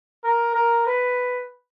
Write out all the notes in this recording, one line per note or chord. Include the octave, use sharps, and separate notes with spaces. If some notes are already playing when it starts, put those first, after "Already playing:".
A#4
A#4
B4